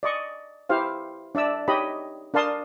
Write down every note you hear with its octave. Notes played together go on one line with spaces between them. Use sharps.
D5 D#5 C#6
E4 G4 C5 F5
D4 D5 E5 E6
D#4 G4 C#5 D#5 B5
D4 A#4 F5 A5 C6 D#6